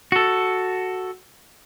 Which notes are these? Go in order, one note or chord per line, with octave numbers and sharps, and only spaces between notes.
F#4 A4